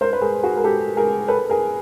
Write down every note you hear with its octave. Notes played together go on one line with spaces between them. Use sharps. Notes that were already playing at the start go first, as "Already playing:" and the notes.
A#4 C5
B4
G#4 A#4
F#4 G#4
A#4
G4 A4
G#4 A#4
A4 B4
G#4 A#4